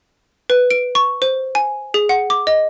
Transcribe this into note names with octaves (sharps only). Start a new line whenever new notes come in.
B4
D7
C#6
C5
G#5
G#4
F#5
D6
D#5